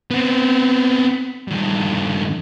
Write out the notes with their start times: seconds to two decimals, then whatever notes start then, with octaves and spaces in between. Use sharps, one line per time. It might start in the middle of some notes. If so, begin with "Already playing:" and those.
0.11 B3 C4
1.48 G2 D#3